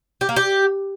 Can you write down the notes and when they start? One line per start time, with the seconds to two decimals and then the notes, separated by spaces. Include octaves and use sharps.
0.21 G4
0.29 A#3
0.36 G4